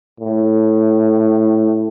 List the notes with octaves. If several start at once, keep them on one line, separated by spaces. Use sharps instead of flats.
A2